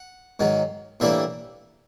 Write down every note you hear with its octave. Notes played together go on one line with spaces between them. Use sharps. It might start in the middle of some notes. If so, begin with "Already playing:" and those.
Already playing: F#5
G#2 D#3 F#3
A2 E3 G3 A#3 D4 E5